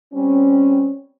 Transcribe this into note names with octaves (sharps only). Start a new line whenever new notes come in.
G3 C4 C#4